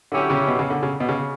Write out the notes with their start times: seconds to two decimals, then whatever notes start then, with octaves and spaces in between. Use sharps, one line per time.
0.12 D3 F#3 C#4 E4 G4
0.30 C#3
0.48 B2
0.59 C#3
0.70 D3
0.83 C#3
1.00 B2
1.09 C#3